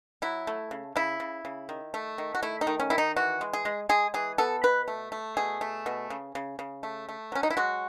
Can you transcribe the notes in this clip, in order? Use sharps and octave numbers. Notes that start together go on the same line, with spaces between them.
F#3 E4
A3
C#3
C#3 E4
C#3
C#3
D#3
A3
D#3
F#4
A3 E4
D#4
D#3
C#4
D#3 E4
D#4
E3 F#4
G#3
G#4
G#3
G#3 G#4
E3 G#4
B3 A4
B2 B4
A3
A3
B2 G#4
A3
B2
C#3
C#3
C#3
A3
A3
F#3 C#4
D#4
E4
G#3 F#4